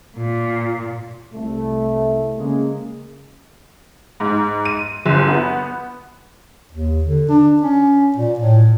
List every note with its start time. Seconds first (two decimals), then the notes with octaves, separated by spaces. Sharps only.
0.17 A#2
1.33 C2 A3
2.38 C#3 G#3 A#3
4.20 G#2
4.65 D#7
5.06 G1
5.27 B3
6.72 D#2
7.04 D3
7.29 D4
7.62 C#4
8.16 A#2
8.39 A2